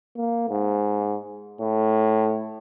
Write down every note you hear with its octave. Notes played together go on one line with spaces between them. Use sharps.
A#3
G#2
A2